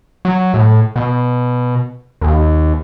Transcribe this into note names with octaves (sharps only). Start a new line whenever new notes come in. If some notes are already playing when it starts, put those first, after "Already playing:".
F#3
A2
B2
D#2